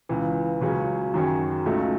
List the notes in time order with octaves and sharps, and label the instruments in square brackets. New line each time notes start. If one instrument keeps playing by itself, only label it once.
[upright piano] C#2 C#3 E3
C#2 C#3 F#3 C#4 G#4
F#2 D#3 F#3 C#4 G#4
C#2 C#3 F#3 A3 D#4